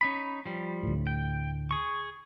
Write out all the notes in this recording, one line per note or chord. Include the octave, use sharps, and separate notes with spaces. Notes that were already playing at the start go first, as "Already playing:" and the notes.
C#4 D#4 B5
F3 G3
D2 A2
G5
G#4 C#6